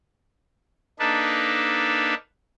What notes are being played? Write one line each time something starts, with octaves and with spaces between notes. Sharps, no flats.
A#3 D4 D#4 A4 B4